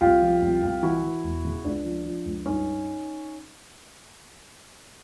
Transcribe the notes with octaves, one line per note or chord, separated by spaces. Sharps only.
C2 F4 G4
F3
C2
C2
E3 E4 F#4
E3
E1
C#3
C#2 D4
F3
F3
C#2
G2 C#4 D#4